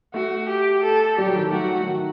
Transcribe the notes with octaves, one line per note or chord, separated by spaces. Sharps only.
A3 F#4
G4
A4
G3 G4
F#3
D#3
F#3
A3 F#4
F#3
F#3
D#3